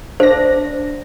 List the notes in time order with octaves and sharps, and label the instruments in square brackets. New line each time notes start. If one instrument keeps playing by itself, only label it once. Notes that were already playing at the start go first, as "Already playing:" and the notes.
[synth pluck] D4 A#6 [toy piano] C5